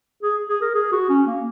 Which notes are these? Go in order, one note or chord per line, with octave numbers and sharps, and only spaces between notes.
G#4
G#4
A#4
G#4
F#4
C#4
A#3